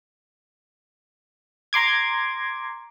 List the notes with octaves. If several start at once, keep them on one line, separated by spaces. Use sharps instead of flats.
A#5 C6 D6 G#6